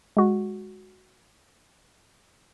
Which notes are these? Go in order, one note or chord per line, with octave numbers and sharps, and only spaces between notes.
G#3 F#4